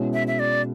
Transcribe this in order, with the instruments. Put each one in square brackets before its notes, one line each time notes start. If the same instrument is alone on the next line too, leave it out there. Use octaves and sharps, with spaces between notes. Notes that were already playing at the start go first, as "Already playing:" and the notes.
Already playing: [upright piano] B2 G#3 C#4 E4
[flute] E5
E5
D5